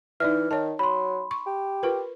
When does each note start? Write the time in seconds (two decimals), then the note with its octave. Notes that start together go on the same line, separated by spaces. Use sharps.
0.20 E3 D#4 D5 E5 F6
0.51 D#3 C#5 A5
0.79 F#3 B5 C6
1.31 C#6
1.46 G4
1.83 F4 A#4 B4